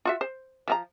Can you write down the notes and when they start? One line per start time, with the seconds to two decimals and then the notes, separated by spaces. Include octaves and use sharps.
0.05 F4 F#4 E5
0.21 C5
0.68 F3 C4 A#5